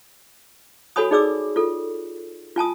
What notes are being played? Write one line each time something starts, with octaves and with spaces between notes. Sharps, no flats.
F#4 A4 C#5 G#5 B5 D#6
D#4 G#4 D5 D6 E6
F4 A4
F4 G#5 A5 D#6